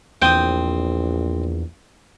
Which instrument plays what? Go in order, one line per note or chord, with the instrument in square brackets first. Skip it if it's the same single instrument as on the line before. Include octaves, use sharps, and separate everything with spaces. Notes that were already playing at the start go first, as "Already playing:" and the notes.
[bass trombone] A#1 [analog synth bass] E2 [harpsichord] C4 D#6 [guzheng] G5